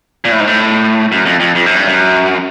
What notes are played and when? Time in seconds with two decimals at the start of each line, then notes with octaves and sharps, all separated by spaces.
0.25 A#2
0.32 A2
0.40 G#2
0.47 A2
1.12 F#2
1.26 F2
1.40 F2
1.55 F2
1.66 F#2
1.76 G2
1.88 F#2